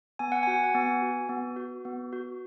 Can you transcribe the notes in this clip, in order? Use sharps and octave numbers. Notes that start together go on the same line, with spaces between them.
B3 G#5
F#5
F#4 G#5
F#5
B3 G#5
F#4
B3
F#4
B3
F#4